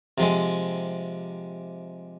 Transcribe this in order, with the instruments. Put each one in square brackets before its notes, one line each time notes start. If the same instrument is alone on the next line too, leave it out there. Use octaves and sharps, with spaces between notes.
[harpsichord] C3 F3 G#3